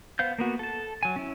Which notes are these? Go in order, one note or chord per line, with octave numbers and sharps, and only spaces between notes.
B3 C5 F5 G6
A#3 B3 F#4
A4 A5
F#3 G#5
C#4 E4